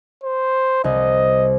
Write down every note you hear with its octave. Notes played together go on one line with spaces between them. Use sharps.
C5
C2 D#5